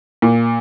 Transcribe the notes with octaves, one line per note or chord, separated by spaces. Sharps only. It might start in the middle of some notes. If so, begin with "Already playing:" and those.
A#2